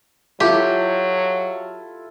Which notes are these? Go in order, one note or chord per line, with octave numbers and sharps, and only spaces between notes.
F#3 E4 F4 G4 A4